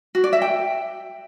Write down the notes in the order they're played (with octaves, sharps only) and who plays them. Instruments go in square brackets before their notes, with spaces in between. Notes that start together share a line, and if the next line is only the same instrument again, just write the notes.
[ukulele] F#4
D5
E5
G5